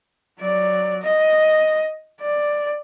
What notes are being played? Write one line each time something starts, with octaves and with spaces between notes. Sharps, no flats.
F#3 D5
D#5
D5